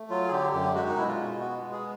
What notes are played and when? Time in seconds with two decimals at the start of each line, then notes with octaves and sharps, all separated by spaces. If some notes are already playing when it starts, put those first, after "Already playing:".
Already playing: A3
0.10 F#3 F4
0.28 G#4
0.31 D3 G4
0.53 F#2 G4
0.75 G#3 F#4
0.88 D#4
0.96 B2 E4
1.08 F4
1.18 B2
1.40 B3 F#4
1.62 G#3
1.73 G#4